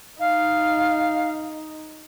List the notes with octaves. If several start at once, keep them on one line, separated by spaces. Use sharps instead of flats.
D#4 F5